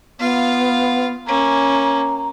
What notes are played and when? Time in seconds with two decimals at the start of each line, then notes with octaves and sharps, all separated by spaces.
0.20 B3 F4 F5
1.27 A#3 C#4 A#5